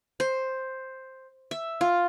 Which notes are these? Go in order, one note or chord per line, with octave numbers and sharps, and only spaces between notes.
C5
E5
F4